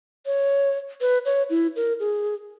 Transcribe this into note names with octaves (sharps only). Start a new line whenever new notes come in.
C#5
B4
C#5
E4
A#4
G#4